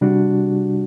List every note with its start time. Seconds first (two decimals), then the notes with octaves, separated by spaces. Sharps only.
0.01 C3 G3 D4 F#4